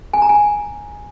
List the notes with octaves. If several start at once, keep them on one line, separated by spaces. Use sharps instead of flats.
G#5
A#5
G#5